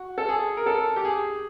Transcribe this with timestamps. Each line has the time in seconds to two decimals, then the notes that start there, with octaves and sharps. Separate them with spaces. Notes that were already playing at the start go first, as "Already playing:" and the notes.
Already playing: F#4
0.18 A4
0.29 G#4
0.57 A#4
0.66 A4
0.96 G4
1.05 G#4